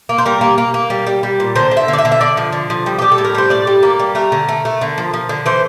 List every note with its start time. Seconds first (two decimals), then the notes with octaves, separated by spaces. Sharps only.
0.09 A#3
0.18 C5
0.25 G3 A#4
0.41 A#3
0.58 A#3
0.74 A#3
0.90 G3
1.07 G3
1.23 G3
1.40 A#2
1.56 D3 C5
1.71 D3
1.77 E5
1.88 D3
1.93 D5
1.98 E5
2.05 D3
2.12 E5
2.21 D3 D5
2.37 F3
2.52 D3
2.70 F3
2.86 G3
2.98 G3 G4
3.12 A4
3.18 A2
3.24 A#4
3.35 G3 C5
3.50 A2 D5
3.67 G3
3.83 A#3
3.99 G3
4.15 A3 A#4
4.32 D3
4.49 A3
4.65 A3
4.81 D3
4.98 F3
5.13 F3
5.29 D3
5.46 E3 C5